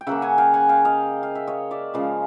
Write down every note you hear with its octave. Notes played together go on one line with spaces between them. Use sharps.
G5
C#3 F#3 A#3 E5 F#5
F#5 G#5
F5 G5
F#5 G#5
F5 G5
D#5 F5
F5
E5
C#5 D#5
D5 E5
C#3 F3 G#3 D#5 F5